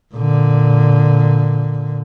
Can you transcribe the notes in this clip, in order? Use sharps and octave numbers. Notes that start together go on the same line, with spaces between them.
A#2 D3